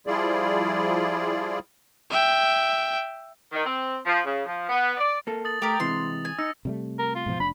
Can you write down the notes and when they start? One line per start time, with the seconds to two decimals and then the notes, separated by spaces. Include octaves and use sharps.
0.07 F3 G3 E4 F4 G#4 D5
2.10 E5 G5
3.53 D#3
3.65 C4
4.06 F3
4.25 C#3
4.45 F3
4.69 B3
4.98 D5
5.27 A#3 A4
5.45 D#6 A6 F#7
5.62 A3 G4 A#4 D#6 F7
5.80 C3 E3 G#3 C6
6.25 G#5
6.39 D#4 E6 A#6 C#7
6.65 C3 G3 A3
6.99 A#4
7.15 F4
7.26 G#2 B2 F3
7.40 F1 D4 B5